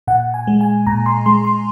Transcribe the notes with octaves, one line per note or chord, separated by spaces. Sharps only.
A#2 F#5
G#5
G#3
G#5
A#2 A#5
C6
G#3 C6
C6